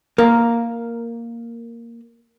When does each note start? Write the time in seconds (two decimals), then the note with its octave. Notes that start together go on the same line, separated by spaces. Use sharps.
0.18 A#3 A#4